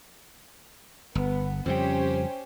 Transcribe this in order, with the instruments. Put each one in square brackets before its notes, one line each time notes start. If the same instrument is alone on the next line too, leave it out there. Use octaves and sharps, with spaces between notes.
[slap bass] G1 [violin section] B3
[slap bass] F2 C#3 G3 [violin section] C#4 G4 C5